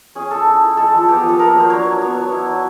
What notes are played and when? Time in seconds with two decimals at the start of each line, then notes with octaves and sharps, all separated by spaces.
0.15 C#4 G#4
0.31 A3 A4
0.46 E4
0.62 A3
0.77 G#3 A4
0.94 F3
1.09 B3 G4
1.19 F3 G#4
1.29 A4
1.39 A#3 A#4
1.55 F#3 C5
1.70 D4 C#5
1.86 F#3
2.02 B3
2.16 F#3
2.32 E4
2.48 F#3